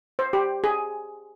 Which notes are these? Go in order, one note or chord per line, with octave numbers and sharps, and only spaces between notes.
C5
G4
G#4